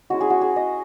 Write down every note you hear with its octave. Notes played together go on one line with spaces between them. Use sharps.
G#3 C#4 E4 F#4
G#4
F#4
G#4
D#5